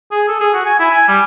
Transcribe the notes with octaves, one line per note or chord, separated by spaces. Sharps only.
G#4
A4
G#4
F#4
G#5
E4
G#5
G3